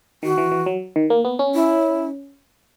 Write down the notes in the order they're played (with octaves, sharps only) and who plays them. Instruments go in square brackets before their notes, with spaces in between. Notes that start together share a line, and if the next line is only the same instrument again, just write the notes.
[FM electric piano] D#3 [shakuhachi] F#4
[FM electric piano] E3
E3
F#3
D#3
A#3
B3
C#4
[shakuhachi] E4